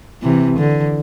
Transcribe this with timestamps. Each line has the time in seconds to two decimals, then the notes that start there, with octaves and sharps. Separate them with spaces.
0.22 C3 E3
0.58 D3